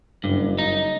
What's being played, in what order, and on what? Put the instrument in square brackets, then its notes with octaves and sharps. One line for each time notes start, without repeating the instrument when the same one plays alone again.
[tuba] F#1 [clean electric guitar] G2
[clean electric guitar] D#4